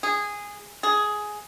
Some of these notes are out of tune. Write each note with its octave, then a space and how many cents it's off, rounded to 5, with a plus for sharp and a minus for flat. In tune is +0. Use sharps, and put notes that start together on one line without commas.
G#4 -15
G#4 +10